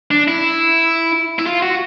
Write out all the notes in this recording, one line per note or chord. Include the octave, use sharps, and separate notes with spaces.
D4
E4
E4
F4
F#4